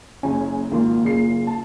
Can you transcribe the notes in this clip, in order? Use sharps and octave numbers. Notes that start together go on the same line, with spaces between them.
F#1 C#4 G#5
G#1 A#3 F4
F#1 C#3 C7
A5